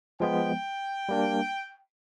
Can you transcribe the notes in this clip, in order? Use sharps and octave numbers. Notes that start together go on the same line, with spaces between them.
F3 G#3 B3 G5
G3 A#3 D4